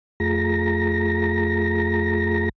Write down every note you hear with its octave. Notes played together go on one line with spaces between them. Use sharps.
F2 A3 F4 G#4 A#5 A#6